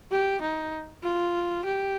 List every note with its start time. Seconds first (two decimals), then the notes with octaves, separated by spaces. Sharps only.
0.11 G4
0.42 D#4
1.03 F4
1.65 G4